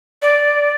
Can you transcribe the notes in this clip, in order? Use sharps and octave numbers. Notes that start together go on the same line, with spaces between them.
D5